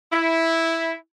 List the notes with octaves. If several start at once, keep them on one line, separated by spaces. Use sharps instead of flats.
E4